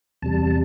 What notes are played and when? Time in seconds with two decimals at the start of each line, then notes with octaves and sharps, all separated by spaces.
0.22 E2 C3 G3 A5